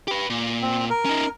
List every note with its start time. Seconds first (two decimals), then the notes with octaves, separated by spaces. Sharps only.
0.08 G4 B4
0.30 A#2
0.62 C4
0.90 A#4
1.05 C#4 D#4